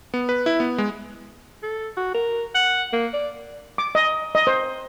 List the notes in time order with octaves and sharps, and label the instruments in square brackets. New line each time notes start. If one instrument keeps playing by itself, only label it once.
[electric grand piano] B3
B4
E4
B3
G#3
[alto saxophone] A4
F#4
A#4
F#5
A#3
D5
[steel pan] D6
D#5
D#5
C5